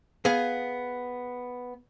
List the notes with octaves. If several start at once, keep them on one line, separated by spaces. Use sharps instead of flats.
B3 G#4 F5